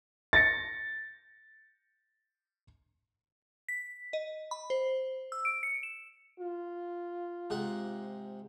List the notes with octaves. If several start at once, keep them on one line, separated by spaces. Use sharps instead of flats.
A6 A#6 C#7
B6
D#5
B5
C5
E6
D7
C#7
E7
F4
G#2 C3 F#5